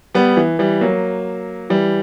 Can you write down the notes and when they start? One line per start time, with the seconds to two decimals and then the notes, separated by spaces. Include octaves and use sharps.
0.15 G3 B3
0.37 E3
0.59 E3 G3
0.81 F#3 A#3
1.70 E3 G3